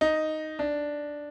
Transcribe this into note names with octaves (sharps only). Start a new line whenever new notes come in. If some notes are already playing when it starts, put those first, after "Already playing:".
D#4
D4